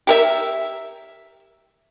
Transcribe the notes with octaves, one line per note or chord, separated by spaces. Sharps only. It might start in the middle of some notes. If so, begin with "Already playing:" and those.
G4 A#4 E5